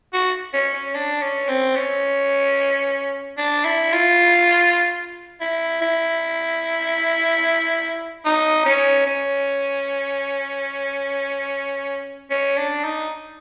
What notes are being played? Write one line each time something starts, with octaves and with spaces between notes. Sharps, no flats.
F#4
C#4
C#4
D4
C#4
C4
C#4
D4
E4
F4
E4
E4
D#4
C#4
C#4
C#4
D4
D#4